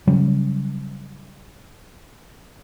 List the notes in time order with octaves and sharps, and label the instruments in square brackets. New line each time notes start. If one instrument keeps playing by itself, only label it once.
[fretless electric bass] C#3 F#3 G3 C#4